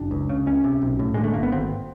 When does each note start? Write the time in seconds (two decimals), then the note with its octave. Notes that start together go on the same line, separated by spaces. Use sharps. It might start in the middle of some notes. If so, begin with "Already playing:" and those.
Already playing: F#1 D4
0.11 C#2
0.29 C#3
0.46 C#2 C#4
0.64 C3
0.82 B1
0.99 A2
1.14 D3 G#3
1.24 A3
1.34 G1 A#3
1.43 B3
1.52 G#1 C4